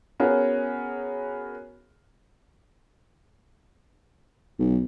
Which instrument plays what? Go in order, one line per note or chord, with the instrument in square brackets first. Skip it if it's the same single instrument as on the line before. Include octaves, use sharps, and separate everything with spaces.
[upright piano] B3 C#4 F#4 G#4 A#4
[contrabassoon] B1